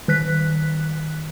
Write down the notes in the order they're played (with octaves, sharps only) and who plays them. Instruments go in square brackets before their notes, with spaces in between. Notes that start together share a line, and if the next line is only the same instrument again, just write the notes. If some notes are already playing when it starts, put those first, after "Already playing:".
[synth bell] D#3 F#6 B6